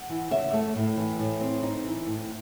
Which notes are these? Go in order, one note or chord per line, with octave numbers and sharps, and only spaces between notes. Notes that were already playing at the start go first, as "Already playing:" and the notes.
Already playing: F#5
E3
C#3 E5
A3
A2
E3
A2
C4
D#4
E3
A2